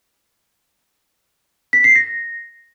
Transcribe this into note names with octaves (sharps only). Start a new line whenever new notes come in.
B6
C7
A#6